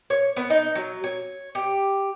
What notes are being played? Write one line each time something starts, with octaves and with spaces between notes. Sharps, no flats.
C#5
B3
D#4
F#3
C#5
G4